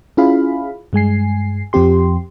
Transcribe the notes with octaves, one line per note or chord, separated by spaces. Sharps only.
C#4 E4 F4 G#4 F5 B5
G2 G#3 G#5 C7
F2 F3 C4 G4 C6